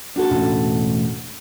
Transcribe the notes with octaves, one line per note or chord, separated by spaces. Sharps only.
D4 F#4 A4
E1 A2 C#4